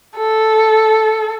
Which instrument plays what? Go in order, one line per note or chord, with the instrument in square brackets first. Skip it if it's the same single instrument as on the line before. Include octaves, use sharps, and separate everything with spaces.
[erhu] A4